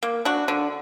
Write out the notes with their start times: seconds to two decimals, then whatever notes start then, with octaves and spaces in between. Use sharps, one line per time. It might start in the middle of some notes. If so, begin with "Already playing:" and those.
0.03 A#3
0.25 D4 F#4
0.48 D3